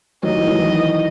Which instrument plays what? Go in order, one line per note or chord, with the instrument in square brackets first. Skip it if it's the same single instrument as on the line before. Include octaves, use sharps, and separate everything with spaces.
[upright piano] D#3 F#3 [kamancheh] D#5
[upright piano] E3
D#3 F#3
E3